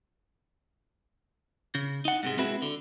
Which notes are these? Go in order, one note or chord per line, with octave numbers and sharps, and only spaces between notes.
C#3
D#4 F#5
G#2 C3 G#3
G#3 B3 C4 E4 F#4 G#4
D3